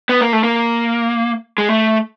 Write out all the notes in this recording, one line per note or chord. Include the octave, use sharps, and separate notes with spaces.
B3
A#3
A3
A#3
G#3
A3